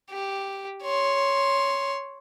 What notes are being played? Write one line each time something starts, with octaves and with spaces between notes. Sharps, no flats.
G4
C#5 C6